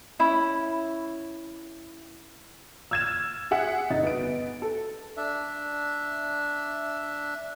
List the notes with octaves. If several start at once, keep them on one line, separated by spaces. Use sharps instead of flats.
C#4 E4 B5
E6 F6 G#6 A6 E7
G#4 E5 F#5
G1 D#4 A6
B3 D7
A4
D4 E5